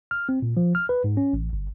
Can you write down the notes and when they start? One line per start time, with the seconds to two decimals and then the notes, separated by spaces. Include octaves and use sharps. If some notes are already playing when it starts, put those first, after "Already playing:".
0.11 F6
0.29 C4
0.42 A#2
0.57 F3
0.75 F6
0.89 B4
1.04 G#2
1.17 C#4
1.33 A1
1.53 G1